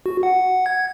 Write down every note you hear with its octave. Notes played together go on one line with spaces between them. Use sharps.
F#4
F#5
G#6